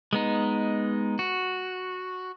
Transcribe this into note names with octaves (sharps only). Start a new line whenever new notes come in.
G#3 B3 D#4
F#4